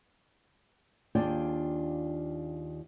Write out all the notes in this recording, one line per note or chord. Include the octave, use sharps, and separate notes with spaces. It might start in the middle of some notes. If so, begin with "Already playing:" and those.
D#2 D4 F4 G#4 D5 G5